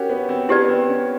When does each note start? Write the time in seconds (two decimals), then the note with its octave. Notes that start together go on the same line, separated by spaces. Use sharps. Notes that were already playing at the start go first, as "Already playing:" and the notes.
Already playing: C#4 F#4 G4 A#4
0.09 B3
0.29 C4
0.49 B3 E4 G4 B4 D5
0.69 C4
0.89 C#4